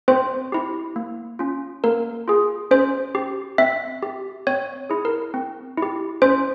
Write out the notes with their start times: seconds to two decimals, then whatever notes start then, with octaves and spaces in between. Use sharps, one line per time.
0.08 C4 C5
0.52 E4 G4
0.96 A#3
1.39 C#4 F4
1.84 A#3 A#4
2.28 F4 G#4
2.71 C#4 C5
3.15 G4
3.58 C4 E5
4.03 G4
4.47 C4 C#5
4.90 E4 G#4
5.05 A#4
5.34 C4
5.77 E4 G4
6.22 C#4 C5